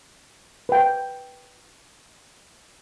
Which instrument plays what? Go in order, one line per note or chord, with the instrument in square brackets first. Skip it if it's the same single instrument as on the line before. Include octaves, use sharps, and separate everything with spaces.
[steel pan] B4 G5